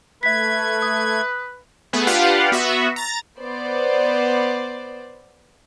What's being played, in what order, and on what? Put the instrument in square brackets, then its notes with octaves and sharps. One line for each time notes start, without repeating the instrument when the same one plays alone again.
[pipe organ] A3 G#6 [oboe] B4 [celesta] E5 B6
[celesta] D#6
[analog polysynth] A3 B3 G#4 B4
D4 F4 G4 B4 F5 F#5
B3 F#4 E5
A#5 A6
[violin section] B3 C5 D5